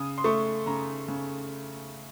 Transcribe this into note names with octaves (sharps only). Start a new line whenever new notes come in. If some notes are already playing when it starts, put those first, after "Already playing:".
Already playing: C#3 D#6
C6
A3 C#6
C#3 A#5
C#3